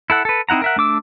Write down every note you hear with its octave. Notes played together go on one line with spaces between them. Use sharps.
E4 A4 F#5
A4 B4
C4 D#4 E4 F#5 A#5
A#4 E5 F#5
A3 D4 D6 E6